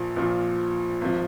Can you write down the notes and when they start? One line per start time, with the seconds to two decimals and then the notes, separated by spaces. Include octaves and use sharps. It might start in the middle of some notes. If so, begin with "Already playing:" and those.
Already playing: A#1 A#2 F3
0.16 A#1 A#2 F3
1.01 G#1 F3